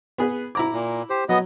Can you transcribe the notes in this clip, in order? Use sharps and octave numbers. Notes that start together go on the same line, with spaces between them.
B3 G#4 B4
E4 A#5 D6
A#2
G4 C5
F#3 B3 D#5